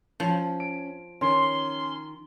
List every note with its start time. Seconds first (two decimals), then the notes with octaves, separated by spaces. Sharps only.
0.20 F3 C#4
0.60 D7
1.21 D#3 C#4 C6